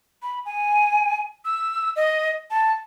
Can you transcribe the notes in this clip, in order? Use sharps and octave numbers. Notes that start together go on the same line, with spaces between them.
B5
G#5
E6
D#5
A5